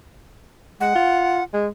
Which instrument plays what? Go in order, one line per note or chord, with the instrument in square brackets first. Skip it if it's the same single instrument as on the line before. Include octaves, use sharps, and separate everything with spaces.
[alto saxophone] G#3 [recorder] F#5
[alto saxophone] F4
G#3